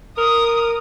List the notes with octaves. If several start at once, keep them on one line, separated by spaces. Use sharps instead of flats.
A#4 D#6